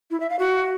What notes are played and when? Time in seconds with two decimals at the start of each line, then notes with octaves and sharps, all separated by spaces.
0.11 E4
0.20 E5
0.30 F5
0.39 F#4